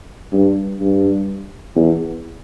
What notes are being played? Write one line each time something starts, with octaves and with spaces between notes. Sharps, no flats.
G2
G2
E2